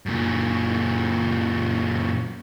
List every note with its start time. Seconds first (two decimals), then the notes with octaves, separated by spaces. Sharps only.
0.06 F#2 A#2